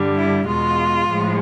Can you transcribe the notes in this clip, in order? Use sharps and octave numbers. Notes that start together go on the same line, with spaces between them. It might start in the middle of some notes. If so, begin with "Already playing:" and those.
Already playing: G2 D3 G3
E4
E2 B2 G#3 F4
A2 F3 G#3